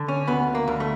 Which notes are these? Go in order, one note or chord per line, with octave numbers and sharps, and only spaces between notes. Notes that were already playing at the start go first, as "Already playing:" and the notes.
Already playing: D3
C#4
D2 B3
A#3
D2
A3